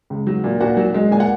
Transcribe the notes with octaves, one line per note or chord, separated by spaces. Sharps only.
C#2
F#3
A#2
A#2 F#4 F#5
F#3
G#3
A#2 G#5
F#5